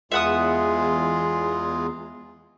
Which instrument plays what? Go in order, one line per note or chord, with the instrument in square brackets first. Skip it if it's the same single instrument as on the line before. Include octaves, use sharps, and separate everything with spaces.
[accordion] E2 [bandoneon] G#3 F4 G#4 [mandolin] E5 F#5 D#6